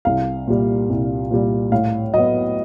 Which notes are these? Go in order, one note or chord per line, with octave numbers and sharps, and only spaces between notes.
C2 F5
A#2 G3
C2
A#2 G3
A2 F5
F#3 B3 D#5